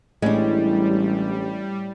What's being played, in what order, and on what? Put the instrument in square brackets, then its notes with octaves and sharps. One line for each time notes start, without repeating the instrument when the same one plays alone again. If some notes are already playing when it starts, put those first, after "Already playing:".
[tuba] A1 [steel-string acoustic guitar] A2 [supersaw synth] G3 [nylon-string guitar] G#3 D4